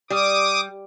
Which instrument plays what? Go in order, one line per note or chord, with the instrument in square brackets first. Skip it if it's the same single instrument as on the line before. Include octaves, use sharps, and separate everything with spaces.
[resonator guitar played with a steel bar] G3 [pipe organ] D6 D#6